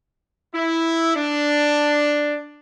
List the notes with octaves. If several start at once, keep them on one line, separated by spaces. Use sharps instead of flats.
E4
D4